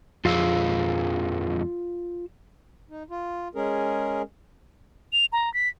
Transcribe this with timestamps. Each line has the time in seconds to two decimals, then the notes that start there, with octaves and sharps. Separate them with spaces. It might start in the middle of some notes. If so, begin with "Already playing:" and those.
0.25 F2 G#3 F4 F5 E6
2.90 D#4
3.10 F4
3.55 G#3 C#4 G#4 A#4
5.13 F7
5.33 A#5
5.54 B6